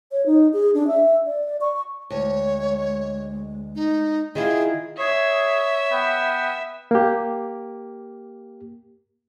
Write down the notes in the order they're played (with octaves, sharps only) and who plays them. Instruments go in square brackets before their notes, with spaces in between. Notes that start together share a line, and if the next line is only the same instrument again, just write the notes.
[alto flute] C#5
D#4
G#4
D4
E5
D5
C#6
[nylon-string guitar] D2 [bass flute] G#3 [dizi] C#5
[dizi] D#4
[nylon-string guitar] D#3 E4 F4 [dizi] G#4
[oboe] G#4 [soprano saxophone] C#5 [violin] E5
[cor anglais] B3 [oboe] G5
[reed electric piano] A#3 G4